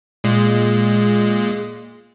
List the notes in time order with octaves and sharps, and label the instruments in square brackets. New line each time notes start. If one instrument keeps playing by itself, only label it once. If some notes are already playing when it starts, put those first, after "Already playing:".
[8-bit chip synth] A#2 G#3